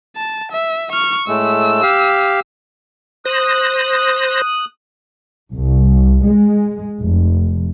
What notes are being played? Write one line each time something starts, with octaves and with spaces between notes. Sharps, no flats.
A5
E5
C#6 F6
A2 G#3 A3 E6
G4 F5
C5 D#6 F#6 A#6
C2
G#3
F1